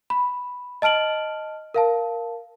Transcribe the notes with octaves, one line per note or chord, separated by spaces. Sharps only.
B5
D#5 A5 F6 D7 F#7
A#4 F5 A5